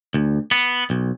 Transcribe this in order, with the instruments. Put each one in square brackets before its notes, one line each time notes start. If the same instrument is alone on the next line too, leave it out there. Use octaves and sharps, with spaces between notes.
[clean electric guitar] D2
B3
B1